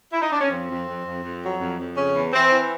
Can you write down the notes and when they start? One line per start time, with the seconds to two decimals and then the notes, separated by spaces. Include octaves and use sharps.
0.12 E4
0.22 D#4
0.32 D4
0.40 C#4
0.50 F2 C4
0.69 F2
0.87 F2
1.05 F2
1.23 F2
1.42 F#3
1.60 F2
1.78 F2
1.96 C#3 C#4
2.15 E2
2.33 E3 C4
2.51 E3